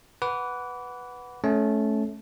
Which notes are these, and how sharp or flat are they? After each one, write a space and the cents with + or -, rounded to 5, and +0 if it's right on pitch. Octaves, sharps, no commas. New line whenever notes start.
B4 +0 F#5 +0 D6 -30
A3 -20 C#4 +0 A5 -15